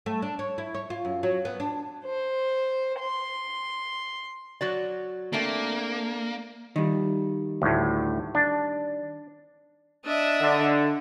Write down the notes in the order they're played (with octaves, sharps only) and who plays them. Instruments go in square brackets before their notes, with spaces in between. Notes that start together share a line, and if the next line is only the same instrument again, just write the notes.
[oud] A3
D4
C#5
E4
C#5
F4
F#2
F#3
B3
D4
[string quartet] C5
C6
[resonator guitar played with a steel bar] F#3 F#4 D5
[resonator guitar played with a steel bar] A3 C4 D4 [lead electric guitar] A#3
[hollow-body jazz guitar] D#3 G3
[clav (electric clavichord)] D2 A2
D4
[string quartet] D4 D#5 E5
[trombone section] D3